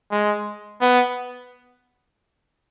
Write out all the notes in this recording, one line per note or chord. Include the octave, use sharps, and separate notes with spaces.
G#3
B3